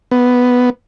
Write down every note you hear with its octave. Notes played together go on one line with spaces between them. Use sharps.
B3